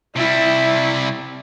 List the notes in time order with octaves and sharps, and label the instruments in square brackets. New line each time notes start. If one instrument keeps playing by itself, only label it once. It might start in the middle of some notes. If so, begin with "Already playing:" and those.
[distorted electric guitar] C3 G3 [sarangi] E4